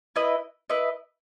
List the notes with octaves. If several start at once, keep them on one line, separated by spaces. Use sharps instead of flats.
E4 B4 D#5
E4 B4 D#5